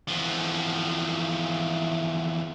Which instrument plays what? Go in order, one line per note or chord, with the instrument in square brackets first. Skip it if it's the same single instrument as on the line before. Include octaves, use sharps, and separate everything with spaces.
[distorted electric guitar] E2 F3